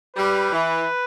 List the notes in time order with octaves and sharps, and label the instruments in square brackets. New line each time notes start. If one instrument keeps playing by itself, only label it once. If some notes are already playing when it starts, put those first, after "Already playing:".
[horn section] G3 [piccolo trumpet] B4
[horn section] E3